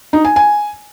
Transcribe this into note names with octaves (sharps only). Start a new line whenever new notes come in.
D#4
G#5
G#5